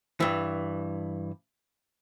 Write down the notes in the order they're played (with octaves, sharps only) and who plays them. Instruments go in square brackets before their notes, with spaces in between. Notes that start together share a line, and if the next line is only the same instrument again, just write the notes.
[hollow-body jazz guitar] G2 E3